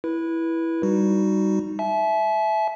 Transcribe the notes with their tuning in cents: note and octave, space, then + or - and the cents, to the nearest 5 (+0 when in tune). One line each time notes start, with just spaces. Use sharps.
E4 +0 B4 -30
G3 +0 D#4 +0 F#4 +0
E5 +0 A5 -45